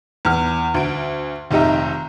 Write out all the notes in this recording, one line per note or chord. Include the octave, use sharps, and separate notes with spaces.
E2 F6
D2 D7
F1 D#3 D#4 G4 E5 A#5